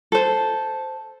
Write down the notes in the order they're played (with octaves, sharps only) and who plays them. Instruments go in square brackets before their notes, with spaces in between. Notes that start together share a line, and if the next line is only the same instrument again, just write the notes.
[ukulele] A4 C5